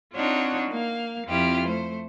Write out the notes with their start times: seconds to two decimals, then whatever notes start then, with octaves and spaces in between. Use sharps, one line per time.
0.14 C4 D4 D#4 F4 F#4 C#5
0.69 A#3 F5
1.27 F2 C4 E4 F4 G4 F6
1.65 A3 C5